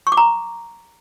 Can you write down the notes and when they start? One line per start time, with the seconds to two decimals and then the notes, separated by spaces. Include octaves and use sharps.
0.07 C#6
0.12 D6
0.17 A#5